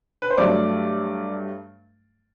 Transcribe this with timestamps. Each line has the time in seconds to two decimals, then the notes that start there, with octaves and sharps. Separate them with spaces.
0.22 B4
0.30 C5
0.38 G2 F#3 A3 D5